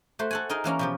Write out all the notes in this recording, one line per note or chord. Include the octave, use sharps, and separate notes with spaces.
A3 F#4 C5
A4 F#5 G#5
D#4 G#4 A#4 D#5
E3 A#3 C#4 A#5
B2 F3 G4